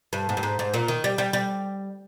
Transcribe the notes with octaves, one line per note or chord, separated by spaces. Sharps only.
G2
G#2
G2
G#2
G#2
A#2
D#3
G3
G3
G3